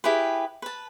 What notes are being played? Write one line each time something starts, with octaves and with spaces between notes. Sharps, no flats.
E4 G4 G#4 B4
B4 A5